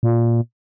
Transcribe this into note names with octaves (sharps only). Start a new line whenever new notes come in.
A#2